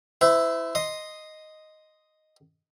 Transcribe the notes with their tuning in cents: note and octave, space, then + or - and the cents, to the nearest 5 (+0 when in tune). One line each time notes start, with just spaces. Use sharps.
E4 +0 C5 -40 E5 +0
D#5 +0 C6 +0